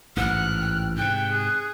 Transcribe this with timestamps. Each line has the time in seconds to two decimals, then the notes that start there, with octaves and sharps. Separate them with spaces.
0.17 A1 G#2 E3 F#5 F6 F#6
0.60 G5
0.97 G#2 C3 G5 F#6
1.32 G#4